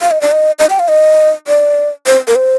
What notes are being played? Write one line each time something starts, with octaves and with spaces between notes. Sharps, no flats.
F5
D#5
D5
D#5
D#5
G5
F5
D#5
D5
C5
A#4
C5